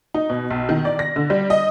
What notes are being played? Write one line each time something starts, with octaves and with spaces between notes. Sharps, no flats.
D#4
B2
B1
D#3
D5
A#6
D3
G3
D#5